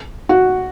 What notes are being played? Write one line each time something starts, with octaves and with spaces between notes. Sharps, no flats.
F#4